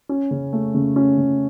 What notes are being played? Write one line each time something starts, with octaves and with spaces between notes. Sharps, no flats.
C#4
C#3
A3
C#3
C#4
C#3